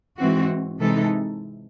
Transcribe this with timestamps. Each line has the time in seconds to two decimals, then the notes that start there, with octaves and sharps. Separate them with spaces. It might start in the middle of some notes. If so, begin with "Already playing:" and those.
0.17 G#2 E3 C4 F#4
0.79 C3 E3 G#3 D#4 A4